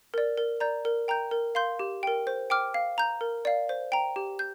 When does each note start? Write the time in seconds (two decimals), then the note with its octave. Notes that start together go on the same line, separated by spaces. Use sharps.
0.14 A#4 D5
0.38 A#4
0.60 D5 A#5 G6
0.85 A#4
1.08 G5 A#5 G6
1.31 A#4
1.55 F5 C6 G6
1.79 G4
2.03 A#4 G5
2.27 C5
2.50 G5 D6 F6
2.74 F5
2.98 A#5 G6
3.21 A#4
3.45 D5 F5
3.69 C5
3.92 G5 A#5
4.16 G4
4.39 G6